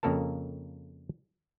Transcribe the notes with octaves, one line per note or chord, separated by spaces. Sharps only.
F2 C#3 A#3 A4 A#4 A5